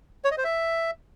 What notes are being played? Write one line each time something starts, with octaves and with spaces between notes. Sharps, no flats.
C#5
D#5
C5
E5